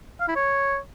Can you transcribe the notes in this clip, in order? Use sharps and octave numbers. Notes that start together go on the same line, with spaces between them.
F5
E4
C#5